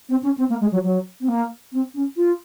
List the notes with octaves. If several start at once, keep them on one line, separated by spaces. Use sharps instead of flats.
C4
C#4
C4
A#3
G#3
F#3
F#3
C4
A#3
C4
C#4
F4